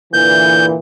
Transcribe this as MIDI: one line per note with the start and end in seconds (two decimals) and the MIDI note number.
0.13 0.77 46
0.13 0.77 50
0.13 0.77 52
0.13 0.66 91